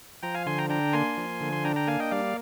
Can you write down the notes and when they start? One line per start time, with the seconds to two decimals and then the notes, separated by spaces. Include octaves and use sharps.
0.23 F3 G5 A#5
0.34 F5 G#5
0.46 D3 G#5 C6
0.58 G5 A#5
0.70 D4 G5 A#5
0.93 A#3 G#5 C6
1.17 F3
1.41 D3
1.53 C6
1.64 D4 G5 A#5
1.76 G5 A#5
1.87 A#3 F5 G#5
2.00 D#5 G5
2.11 G3 D5 F5